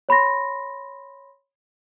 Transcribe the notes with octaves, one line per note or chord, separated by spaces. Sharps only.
C#5 B5 C6 A#6